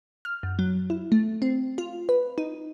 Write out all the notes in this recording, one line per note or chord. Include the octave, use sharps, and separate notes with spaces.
F6
F#2
F#3
E4
A3
C4
F4
B4
D#4